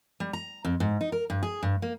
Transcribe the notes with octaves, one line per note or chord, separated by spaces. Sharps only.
G3
A#5
F2
G#2
D#4
A#4
G2
G#4
G2
A#3